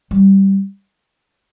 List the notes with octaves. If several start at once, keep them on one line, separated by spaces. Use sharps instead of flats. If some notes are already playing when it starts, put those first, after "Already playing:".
G3